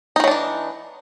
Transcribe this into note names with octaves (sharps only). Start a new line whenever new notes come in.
D#3 E3 F#3 D4 D#4